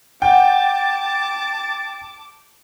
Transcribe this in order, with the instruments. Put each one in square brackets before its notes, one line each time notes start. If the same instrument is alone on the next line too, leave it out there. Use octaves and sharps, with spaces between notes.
[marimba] F#5 [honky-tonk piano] G5 [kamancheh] A5 D6 [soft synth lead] A6